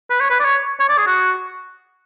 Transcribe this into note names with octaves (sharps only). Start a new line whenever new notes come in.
B4
C#5
B4
D5
C#5
C#5
D5
G#4
F#4